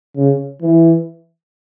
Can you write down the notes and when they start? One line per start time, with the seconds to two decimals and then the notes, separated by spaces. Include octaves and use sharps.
0.17 C#3
0.62 E3